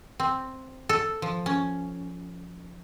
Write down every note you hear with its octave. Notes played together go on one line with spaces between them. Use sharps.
C4
A4
F3
C#4